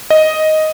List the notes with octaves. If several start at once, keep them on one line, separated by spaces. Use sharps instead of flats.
D#5